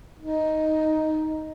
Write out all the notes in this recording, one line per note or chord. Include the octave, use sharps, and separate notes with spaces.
D#4